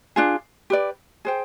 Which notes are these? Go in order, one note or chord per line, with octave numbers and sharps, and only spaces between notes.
D4 F4 G#4
G4 B4 D5
G#4 C5 G5